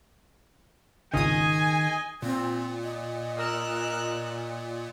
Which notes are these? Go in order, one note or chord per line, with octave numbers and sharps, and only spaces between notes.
G#1 C#2 D#3 G#4 D#5 G#5 D#6
A#2 C4
D#5
A#4 E6 F#6